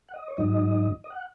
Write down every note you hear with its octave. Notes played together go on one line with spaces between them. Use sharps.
F#5
D#5
C#5
G#2 F#3 D#4 D#5
D#5
F#5